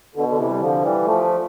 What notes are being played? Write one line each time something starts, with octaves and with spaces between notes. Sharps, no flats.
B2 D3
D3
C3 E3
G3
D3 F3
E3 G3
F3 A3